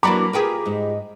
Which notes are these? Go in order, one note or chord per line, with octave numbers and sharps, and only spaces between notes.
E3 F#3 A#3 D4 F#4 A#5 B5 D6
F4 G4 G#4 A#4 B4
G#2 D#4